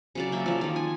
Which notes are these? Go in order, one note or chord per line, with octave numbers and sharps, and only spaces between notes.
C#3 F#3 D5
A#3 E5
F3 D5
D#3 F3
G#5